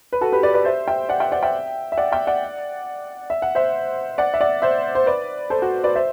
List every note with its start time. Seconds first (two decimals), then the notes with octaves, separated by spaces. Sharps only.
0.13 B4
0.21 F#4 A4
0.32 G4 B4
0.43 B4 D5
0.54 B4 D5
0.65 C5 E5
0.88 E5 G5
1.09 D5 F#5
1.20 E5 G5
1.32 D5 F#5
1.43 E5 G5
1.92 E5
1.97 D5 F#5
2.12 E5 G5
2.27 D5 F#5
3.30 E5
3.42 F#5
3.55 C5 E5
4.18 D5 F#5
4.34 E5
4.41 D5 F#5
4.62 C5 E5
4.95 C5
5.06 B4 D5
5.50 A4 C5
5.62 F#4
5.84 B4 D5
5.96 C5 E5